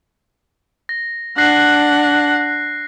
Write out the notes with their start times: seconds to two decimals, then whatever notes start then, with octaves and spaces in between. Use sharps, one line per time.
0.89 A#6
1.38 D4 F#5 F#6 A#6 C7